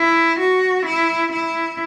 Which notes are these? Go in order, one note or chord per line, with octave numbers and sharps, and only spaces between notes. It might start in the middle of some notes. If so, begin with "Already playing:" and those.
Already playing: E4
F#4
E4
E4